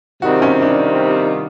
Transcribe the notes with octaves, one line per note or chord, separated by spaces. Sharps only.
C3 D#3 G3 C4 F4 F#4
C#4
D4